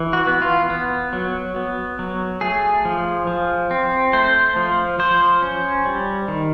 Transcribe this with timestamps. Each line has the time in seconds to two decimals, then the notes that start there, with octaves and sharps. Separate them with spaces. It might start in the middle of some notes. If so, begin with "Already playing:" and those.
Already playing: E3
0.13 F#4
0.27 B3
0.42 F4
0.70 B3
1.13 F#3
1.56 B3
1.99 F#3
2.41 A3 G#4
2.85 F3
3.27 F3
3.71 C4
4.13 A3 C5
4.56 F3
4.99 F3 C5
5.42 C#4
5.85 G3
6.28 D#3